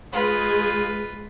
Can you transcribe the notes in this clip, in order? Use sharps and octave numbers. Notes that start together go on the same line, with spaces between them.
G#3 F4 B4